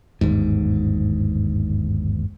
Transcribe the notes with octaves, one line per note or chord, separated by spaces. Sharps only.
G1 D#2 G#2